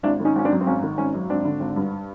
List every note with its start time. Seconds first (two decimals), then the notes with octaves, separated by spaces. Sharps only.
0.03 G#1 D4 E4
0.20 D#3
0.25 C#4 D#4
0.36 G#1 C#4
0.45 C4 D4
0.51 F#2
0.61 C4
0.67 G#1 C#4
0.83 D#3
0.98 G#1 C#4
1.14 F#2
1.30 G#1 C4 D4
1.45 D3
1.60 G#1
1.76 G2